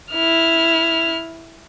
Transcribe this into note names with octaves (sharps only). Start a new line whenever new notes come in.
E4 F6